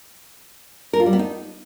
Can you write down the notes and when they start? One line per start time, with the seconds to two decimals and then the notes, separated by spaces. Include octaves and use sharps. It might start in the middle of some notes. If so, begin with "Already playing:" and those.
0.93 A#4
1.00 F4
1.06 G3
1.13 B3
1.19 D#4